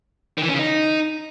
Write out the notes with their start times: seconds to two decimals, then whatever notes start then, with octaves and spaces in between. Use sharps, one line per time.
0.38 D#3
0.43 E3
0.48 C#4
0.54 C#3
0.59 D#4